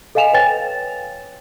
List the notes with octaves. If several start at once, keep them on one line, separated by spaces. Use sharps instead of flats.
A4 D#5 F5 G#5 E7 F7
B4 C#5 G5 G#5 A6